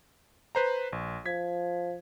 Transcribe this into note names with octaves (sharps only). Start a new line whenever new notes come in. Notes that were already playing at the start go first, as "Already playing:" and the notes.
B4 C5 A#5
A#1
F3 G#6 B6